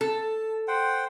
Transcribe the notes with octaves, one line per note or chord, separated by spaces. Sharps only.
A4 A5
C5 F#5 G5